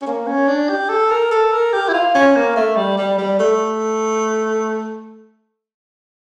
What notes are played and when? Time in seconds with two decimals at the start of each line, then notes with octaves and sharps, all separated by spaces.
0.02 C#4
0.07 A#3
0.27 C#4
0.48 D4
0.69 G4
0.89 A4
1.11 A#4
1.31 A4
1.52 A#4
1.73 G4
1.88 E4
1.93 F4
2.15 C#4
2.35 A#3
2.56 A3
2.76 G3
2.97 G3
3.18 G3
3.39 A3